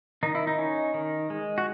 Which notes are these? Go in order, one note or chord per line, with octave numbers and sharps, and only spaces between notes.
D#3 D#4
E4
D#4
C#4
D#3
G#3
F#4